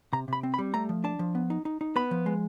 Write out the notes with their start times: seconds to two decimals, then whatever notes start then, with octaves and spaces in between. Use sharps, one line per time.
0.13 C3 A#5
0.28 C3 B5
0.43 C4
0.54 B5
0.59 G3
0.74 A3 A#5
0.89 F3
1.04 D4 A5
1.19 F3
1.35 B3
1.50 D#4
1.65 D#4
1.81 D#4
1.96 B3 B5
2.11 F3
2.26 G#3